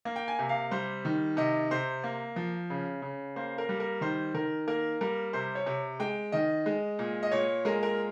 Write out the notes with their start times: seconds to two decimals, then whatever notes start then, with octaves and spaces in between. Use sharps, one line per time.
0.05 A#3
0.16 G5
0.28 G#5
0.39 C3
0.49 F5
0.71 G3 C5
1.05 D#3
1.37 C3 D#5
1.71 C3 C5
2.04 A#3
2.36 F3
2.70 C#3
3.02 C#3
3.36 A#3 C5
3.58 A#4
3.69 G3
3.80 A#4
4.01 D#3 C5
4.34 D#3 A#4
4.68 A#3 A#4
5.01 G3 A#4
5.33 C3 C5
5.55 C#5
5.66 C3
6.00 G#3 G5
6.32 D#3 D#5
6.66 G#3
6.99 A#2
7.23 D#5
7.31 A#2 C#5
7.65 G#3 A#4
7.83 A#4